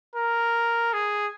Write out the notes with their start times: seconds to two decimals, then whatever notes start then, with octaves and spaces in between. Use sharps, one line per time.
0.15 A#4
0.93 G#4